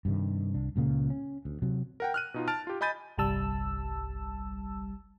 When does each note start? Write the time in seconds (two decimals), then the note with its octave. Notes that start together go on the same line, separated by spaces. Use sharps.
0.05 G2 C3 D#3
0.54 C2 D4
0.76 C#2 A#2 C#3 A#3
1.10 C#4
1.45 D2
1.62 C3 F#3
2.00 A#4 F#5 G5
2.14 F6 F#6 D#7
2.34 B2 D#4 F4
2.48 A5 F6 A6 D7
2.67 F4 G4
2.81 D#5 G#5 B5 G6 A6 D#7
3.17 G1 C2 G3 A5 E6